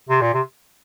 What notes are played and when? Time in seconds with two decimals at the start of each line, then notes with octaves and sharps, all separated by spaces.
0.09 C3
0.22 A#2
0.34 C3